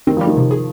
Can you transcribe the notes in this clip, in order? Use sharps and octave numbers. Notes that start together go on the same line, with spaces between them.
D#3 C4
F3 G3
D#3
C3
G#4